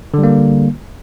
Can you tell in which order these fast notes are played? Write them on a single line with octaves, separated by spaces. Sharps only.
D3 G3 A#3